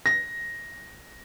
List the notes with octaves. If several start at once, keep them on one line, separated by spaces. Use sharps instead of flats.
A#6